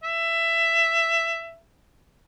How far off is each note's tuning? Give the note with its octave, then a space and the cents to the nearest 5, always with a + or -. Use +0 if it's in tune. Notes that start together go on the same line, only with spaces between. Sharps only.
E5 +15